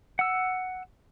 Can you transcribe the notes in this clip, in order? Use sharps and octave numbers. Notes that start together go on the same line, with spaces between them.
F#5 E6